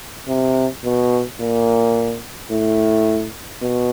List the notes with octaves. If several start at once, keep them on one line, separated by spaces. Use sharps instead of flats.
C3
B2
A#2
A2
B2